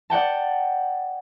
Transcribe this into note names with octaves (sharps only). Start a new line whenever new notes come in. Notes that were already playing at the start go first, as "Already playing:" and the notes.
D5 F#5 G5 A5